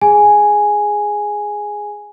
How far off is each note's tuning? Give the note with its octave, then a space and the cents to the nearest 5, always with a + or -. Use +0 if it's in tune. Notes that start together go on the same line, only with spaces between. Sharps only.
G#4 +0 G#5 +0